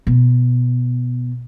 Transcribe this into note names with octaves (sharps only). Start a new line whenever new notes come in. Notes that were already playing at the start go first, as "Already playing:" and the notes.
B2